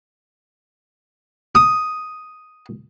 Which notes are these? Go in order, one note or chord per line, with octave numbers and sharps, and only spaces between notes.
D#6